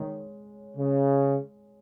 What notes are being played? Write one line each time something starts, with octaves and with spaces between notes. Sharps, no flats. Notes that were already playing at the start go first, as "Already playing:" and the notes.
Already playing: D#3 G#3 C#5
C#3